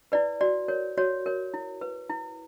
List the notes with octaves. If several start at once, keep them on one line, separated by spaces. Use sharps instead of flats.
E4 B4 D5
F#4 D5
A#4 C#5
F#4 C#5
A#4 C#5
E4
B4
E4